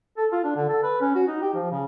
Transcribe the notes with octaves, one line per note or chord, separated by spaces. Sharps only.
A4
F4
D4
D3
A4
B4
C#4
F#4
D#4
G4
F3
C#3